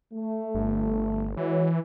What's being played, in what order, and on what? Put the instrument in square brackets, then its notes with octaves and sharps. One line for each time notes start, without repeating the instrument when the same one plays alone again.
[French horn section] A3
[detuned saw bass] G1
[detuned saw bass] E3 [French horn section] G#3 F#4 C#5